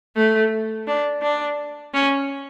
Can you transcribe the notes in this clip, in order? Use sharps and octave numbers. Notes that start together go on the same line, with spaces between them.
A3
D4
D4
C#4